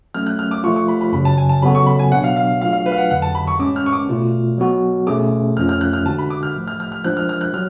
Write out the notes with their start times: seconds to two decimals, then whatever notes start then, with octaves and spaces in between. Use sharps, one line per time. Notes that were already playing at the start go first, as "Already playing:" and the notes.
0.14 F#3 A3 C#4 F6
0.27 F#6
0.39 F6
0.51 D6
0.64 F3 A3 F4 C#6
0.76 C#6
0.88 B5
1.01 B5
1.13 F#2 C#3 F#3 B5
1.25 A5
1.38 G#5
1.49 A5
1.62 C#3 F#3 B3 F#4 A4 B5
1.75 C#6
1.86 B5
1.99 G#5
2.12 B2 F#3 B3 D4 F#5
2.24 F5
2.36 F5
2.61 F#3 A3 D4 F4 G#4 F5
2.73 F5
2.86 B4
2.92 F5
2.98 F#5
3.10 F2 D3 F#3 F#5
3.22 A5
3.35 B5
3.47 C#6
3.59 A2 G#3 C#4 D6
3.76 F6
3.86 C#6
3.93 D6
4.09 B2 A3 F4
4.58 F#3 B3 F#4
5.07 B2 A3 C#4 G#4 D6
5.57 F2 F3 A3 C#4 F4 F6
5.69 F6
5.81 F#6
5.93 F6
6.06 D3 G#3 D4 F#4 A5
6.18 B5
6.30 D6
6.43 F6
6.56 A2 F3 A3
6.67 F6
6.80 F6
6.92 F6
7.04 F3 G#3 D4 F#6
7.17 F6
7.29 F6
7.41 F#6
7.54 F#3 F6